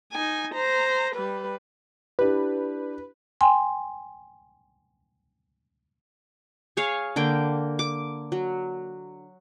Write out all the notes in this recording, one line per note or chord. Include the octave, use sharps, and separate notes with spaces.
D#4 G#5
C5 A#5
G3 B4
D4 E4 G4 B4
G5 G#5 C6
G#4 C#5 F5 G#5
D3 A#3 G5
D6
F#3